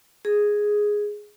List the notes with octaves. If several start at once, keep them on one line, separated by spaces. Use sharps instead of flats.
G#4